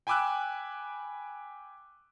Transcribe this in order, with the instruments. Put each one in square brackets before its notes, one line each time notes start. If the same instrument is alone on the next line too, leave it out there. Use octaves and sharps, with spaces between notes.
[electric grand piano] G5 G#5 B5 D6 E6 F#6